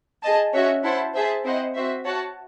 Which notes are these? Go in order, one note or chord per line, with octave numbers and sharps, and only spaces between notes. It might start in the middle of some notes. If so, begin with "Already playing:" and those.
G#4 D#5 A5
C#4 F#4 C#5 E5
E4 C5 F#5 A5
G#4 C5 E5 A5
C4 E4 C5 D#5 F#5
C4 F#4 C5 E5
F#4 C#5 F#5 A5